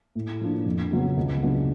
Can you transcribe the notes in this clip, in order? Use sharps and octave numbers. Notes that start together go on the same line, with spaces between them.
A2
F3 A#3 D4
F2
C#3 F#3 B3
C#2
C#3 F#3 B3 D4